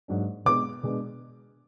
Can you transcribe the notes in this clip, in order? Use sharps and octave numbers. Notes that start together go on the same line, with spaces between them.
G#2 F#3 A#3 D4
B2 G#3 B3 D4 D6
B2 G#3 B3 D4